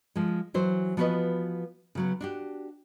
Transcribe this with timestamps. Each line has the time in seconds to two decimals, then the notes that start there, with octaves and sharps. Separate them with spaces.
0.16 F3 G#3
0.54 E3 F#3 C5
0.97 F3 B3 F#4 A#4 B4 D#5
1.95 C#3 F#3 B3
2.21 D4 F#4 G4